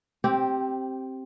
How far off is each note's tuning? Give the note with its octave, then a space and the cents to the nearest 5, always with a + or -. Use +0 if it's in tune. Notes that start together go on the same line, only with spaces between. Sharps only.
C4 +10 G4 -10